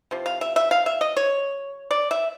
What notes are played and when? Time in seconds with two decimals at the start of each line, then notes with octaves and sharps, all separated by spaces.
0.11 C3 F3
0.26 F5
0.41 E5
0.56 E5
0.71 F5
0.86 E5
1.01 D#5
1.17 C#5
1.91 D5
2.11 E5